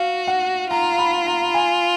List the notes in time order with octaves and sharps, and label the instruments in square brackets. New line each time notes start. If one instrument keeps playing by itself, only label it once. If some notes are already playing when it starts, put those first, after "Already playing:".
Already playing: [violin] F#4 [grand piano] F5
[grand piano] F#5
[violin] F4 [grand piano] A#5
[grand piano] B5
A#5
G#5